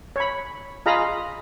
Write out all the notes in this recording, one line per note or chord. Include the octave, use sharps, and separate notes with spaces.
C#5 B5
F4 G#4 D#5 F5 A#5 B5